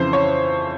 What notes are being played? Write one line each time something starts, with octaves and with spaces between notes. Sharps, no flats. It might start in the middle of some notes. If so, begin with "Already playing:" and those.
Already playing: F2 C#3 E3 C5
C#5